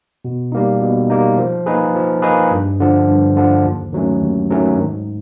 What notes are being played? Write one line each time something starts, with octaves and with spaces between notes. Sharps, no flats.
B2
G3 A#3 D#4
B2
G3 A#3 D#4
F3
A#3 D#4 G#4 B4
F3
A#3 D#4 G#4 B4
G2
D3 F3
G2
D3 F3
D#2
D#3 F#3 A3 C#4
D#2
D#3 F#3 A3 C#4
G#2